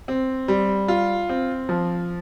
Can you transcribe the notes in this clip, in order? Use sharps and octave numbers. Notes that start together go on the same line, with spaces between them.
C4
G3
F4
C4
F3